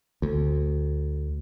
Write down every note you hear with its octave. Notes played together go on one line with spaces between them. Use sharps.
D2